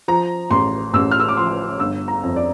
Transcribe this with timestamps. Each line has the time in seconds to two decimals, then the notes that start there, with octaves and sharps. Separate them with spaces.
0.08 F3 A#5
0.50 A1 C6
0.94 A1 E6
1.11 F6
1.20 E6
1.28 D6
1.37 F3 C6
1.80 G1 E6
2.08 A#5
2.23 F2
2.36 D5